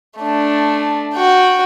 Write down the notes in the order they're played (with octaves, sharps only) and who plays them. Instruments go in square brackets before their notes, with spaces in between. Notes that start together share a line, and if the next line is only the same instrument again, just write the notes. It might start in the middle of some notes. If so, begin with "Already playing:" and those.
[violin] A3 D4
F#4 G5